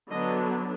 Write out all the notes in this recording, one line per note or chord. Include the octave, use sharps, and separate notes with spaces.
D3 F#3 B3 D4 D#5